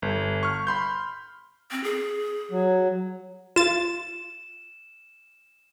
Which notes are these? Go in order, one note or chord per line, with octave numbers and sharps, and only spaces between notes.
G1
C#6 F6
B5 C6 G6
C4
G#4
F#3
F4 A6 E7